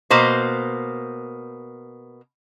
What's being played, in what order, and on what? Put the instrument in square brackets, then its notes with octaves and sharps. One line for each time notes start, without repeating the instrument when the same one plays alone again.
[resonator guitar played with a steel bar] B2 A#3 C5